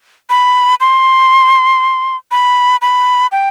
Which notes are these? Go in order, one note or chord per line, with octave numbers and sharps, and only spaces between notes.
B5
C6
B5
B5
G5